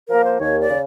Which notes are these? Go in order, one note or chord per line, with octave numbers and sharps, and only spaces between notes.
F3 A#3 A#4
C5
D#2 C#5
D5
C#3